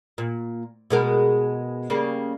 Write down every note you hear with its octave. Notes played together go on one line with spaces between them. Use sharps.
A#2
B2 G#3 A#4
C#3 G3 A#3